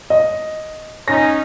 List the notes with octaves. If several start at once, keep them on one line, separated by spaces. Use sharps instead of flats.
D#5
C#4 D#4 A#6